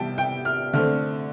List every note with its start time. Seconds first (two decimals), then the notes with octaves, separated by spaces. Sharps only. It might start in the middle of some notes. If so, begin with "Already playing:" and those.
Already playing: C3 E3 G3 B3 G5 A5
0.18 G5
0.45 F6
0.73 D3 A3 C4 F6